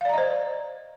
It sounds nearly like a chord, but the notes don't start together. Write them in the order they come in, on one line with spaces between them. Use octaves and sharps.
F5 D5 A#5 D#5 C5